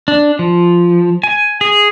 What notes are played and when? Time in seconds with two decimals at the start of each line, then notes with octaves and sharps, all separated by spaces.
0.08 D4
0.39 F3
1.24 G#5
1.61 G#4